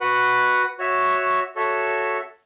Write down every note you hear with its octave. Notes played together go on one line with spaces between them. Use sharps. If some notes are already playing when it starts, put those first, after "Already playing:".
F#4 B4 F#5
F#4 C#5 E5
F#4 A4 C#5 E5